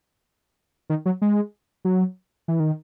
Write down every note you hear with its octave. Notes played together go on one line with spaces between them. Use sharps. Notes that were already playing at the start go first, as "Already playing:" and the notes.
D#3
F#3
G#3
F#3
E3
D#3